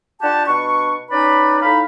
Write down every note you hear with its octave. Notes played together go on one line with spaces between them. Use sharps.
D4 F4 G4 F#5 A5
B2 D4 C#6
C#4 D#4 B4 D5 B5
A2 D#4 F5 B5